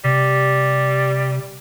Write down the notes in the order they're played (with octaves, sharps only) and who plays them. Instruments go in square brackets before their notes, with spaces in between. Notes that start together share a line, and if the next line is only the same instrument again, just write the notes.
[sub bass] C3 [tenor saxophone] G3